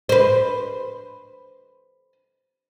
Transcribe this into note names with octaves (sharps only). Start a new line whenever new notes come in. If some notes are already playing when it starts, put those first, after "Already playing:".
B4 C5